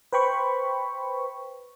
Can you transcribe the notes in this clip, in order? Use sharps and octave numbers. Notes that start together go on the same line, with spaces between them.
B4 C5 G5 B5 C#6